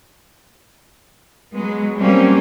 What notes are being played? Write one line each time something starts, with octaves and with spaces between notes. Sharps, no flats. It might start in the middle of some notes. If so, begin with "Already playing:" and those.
F#3 G#3 B3
F#3 G3 A#3 C4 C#4 G4